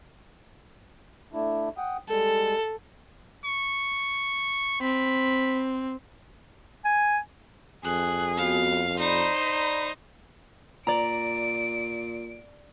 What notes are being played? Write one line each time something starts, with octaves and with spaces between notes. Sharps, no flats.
A3 D4 E4
F#5 G5 D#6
G3 G#3 A4
C#6
C4 B5
G#5
F2 G#4 F#6
B3 F#4 F5
D#4 C5 D5 A#5 B5
A#2 D5 A#5 D7